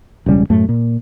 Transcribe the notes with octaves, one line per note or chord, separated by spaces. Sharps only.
E1 C#2 G3 C#4
F#2 A2 A3
A#2